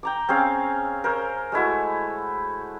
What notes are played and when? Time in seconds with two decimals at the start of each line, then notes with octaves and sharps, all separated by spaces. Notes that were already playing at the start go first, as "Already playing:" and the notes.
0.03 G5 A#5 D6
0.29 C4 C#4 G#4 F5
1.04 A#4 C5 C#5
1.52 G#3 A3 E4 F#4